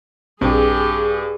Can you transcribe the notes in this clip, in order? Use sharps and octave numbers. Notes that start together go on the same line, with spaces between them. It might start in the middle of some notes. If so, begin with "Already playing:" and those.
A#1 G2 C4 G4 G#4